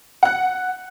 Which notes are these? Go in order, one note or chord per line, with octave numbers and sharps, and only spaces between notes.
F#5 F#6